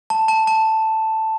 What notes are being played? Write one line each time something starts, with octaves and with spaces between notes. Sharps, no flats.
A5
A5
A5